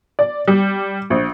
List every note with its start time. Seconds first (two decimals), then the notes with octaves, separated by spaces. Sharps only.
0.19 D5
0.48 G3
1.10 A#1